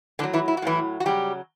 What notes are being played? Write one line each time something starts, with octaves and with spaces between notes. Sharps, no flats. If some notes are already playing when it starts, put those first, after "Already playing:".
A2 D3 F#3 D4
E3 E4
E4
F#4
A2 E3 F#3 E4
F#4
C#3 F#3 G3 G4